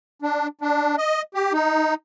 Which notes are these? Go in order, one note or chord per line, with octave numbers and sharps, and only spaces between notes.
D4
D4
D#5
G4
D#4